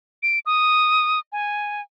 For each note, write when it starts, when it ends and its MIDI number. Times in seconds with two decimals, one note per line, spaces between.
0.23 0.39 98
0.46 1.19 87
1.32 1.81 80